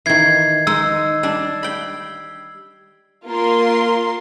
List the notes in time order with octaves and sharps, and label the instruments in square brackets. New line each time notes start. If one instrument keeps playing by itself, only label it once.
[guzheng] D#3 E3 [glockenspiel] G#6 C7
[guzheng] G#3 D#4 [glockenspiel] E6
[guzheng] G3 D4
G5 B5
[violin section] A#3 F4 A#4 C6